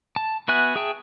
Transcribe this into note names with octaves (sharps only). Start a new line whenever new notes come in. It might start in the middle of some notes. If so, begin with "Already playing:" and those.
A5
B3 F#4 E5 G#5 F#6
G#4 E5 G5 A5